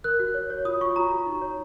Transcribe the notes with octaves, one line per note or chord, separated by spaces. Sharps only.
A#4 F#6
F#4
C#5
C#5
F4 D#6
F4 C#6
F#4 A#5
F#4
D#4
C#5